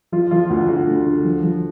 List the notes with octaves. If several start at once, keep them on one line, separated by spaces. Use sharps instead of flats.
F3 F4
F3 F4
D2 F#4
D3 F#4
D2
D3
F3
F3